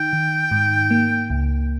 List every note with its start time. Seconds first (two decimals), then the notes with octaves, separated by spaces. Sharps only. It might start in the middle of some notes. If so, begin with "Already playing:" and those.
Already playing: D#3 D#4 G5
0.13 D#3
0.51 G#2
0.91 A#3
1.30 C#2